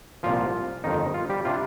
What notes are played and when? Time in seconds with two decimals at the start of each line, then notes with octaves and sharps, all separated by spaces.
0.23 C2 A#2 F3 F4
0.84 G1 F2 D#3 D#4
1.14 F4
1.30 G3 G4
1.45 C3 G3 D4 F4